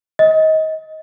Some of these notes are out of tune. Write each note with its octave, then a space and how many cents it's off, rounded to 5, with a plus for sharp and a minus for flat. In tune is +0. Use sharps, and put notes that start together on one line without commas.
D#5 +25